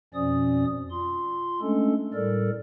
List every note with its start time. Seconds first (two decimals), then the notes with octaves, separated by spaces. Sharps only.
0.14 F2 B2 F3 C#4 D5 D#6
0.91 F4 C6
1.61 G#3 A3 C#4 D4 A4
2.14 A2 G3 A4 A#4 D5